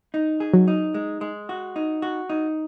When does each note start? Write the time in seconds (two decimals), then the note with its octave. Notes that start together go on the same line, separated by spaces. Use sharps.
0.14 D#4
0.40 G#4
0.54 F#3
0.68 D#4
0.94 G#3
1.21 G#3
1.49 F#4
1.76 D#4
2.02 F#4
2.30 D#4